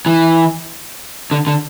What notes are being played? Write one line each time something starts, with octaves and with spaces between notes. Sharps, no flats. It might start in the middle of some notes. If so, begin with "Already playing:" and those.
E3
D3
D3